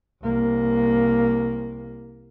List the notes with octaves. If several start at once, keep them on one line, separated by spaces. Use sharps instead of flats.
C2 A#3